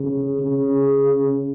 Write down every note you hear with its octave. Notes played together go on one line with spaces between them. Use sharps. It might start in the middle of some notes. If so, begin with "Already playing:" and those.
Already playing: C#3
C#3